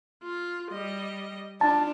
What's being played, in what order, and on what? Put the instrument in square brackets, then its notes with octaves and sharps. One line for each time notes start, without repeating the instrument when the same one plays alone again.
[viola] F4
G3 D#5
[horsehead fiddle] D4 [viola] F4 [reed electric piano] A5